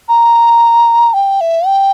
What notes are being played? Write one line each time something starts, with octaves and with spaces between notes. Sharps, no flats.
A#5
G5
E5
G5